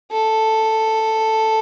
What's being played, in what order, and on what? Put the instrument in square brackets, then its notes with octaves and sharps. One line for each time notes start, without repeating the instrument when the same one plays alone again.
[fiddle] A4